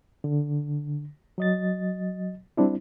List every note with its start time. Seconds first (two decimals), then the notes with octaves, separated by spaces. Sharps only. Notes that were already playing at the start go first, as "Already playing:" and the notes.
0.24 D3
1.38 F#3 D#5 A6
2.57 G3 C4 D4 E4